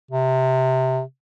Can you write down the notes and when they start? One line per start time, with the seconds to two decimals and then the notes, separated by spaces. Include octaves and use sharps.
0.11 C3